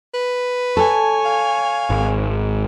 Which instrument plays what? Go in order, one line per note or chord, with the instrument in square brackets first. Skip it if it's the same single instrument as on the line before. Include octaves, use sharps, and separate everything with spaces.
[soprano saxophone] B4
[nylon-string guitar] A4 [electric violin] C#5 G#5
[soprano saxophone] F5
[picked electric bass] G#1